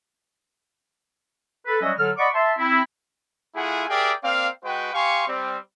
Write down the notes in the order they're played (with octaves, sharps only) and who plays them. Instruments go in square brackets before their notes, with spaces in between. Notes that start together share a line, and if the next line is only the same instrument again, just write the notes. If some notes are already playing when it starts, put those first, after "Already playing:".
[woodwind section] A4 B4
F#3 G3 C#4 F#4 D#5 E5
D3 F#3 A4 F6
D5 D#5 F#5 B5 C#6 D6
E5 A5 C6
C4 E4
[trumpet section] A3 E4 F4 G#4 F#5 G#5
G4 G#4 A#4 D5 E5 G5
A#3 C4 D5 F5
G#3 F#4 B4 G5
G4 F5 G#5 C6 C#6
G3 C4